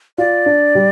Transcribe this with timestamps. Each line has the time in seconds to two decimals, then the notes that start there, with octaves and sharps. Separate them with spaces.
0.18 F4 D5
0.46 D4
0.75 G3